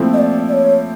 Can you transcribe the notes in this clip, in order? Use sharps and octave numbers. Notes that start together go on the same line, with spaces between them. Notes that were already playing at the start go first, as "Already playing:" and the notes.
Already playing: A#2 F3 A3 C4 E4
D#5
D5
D5
C#5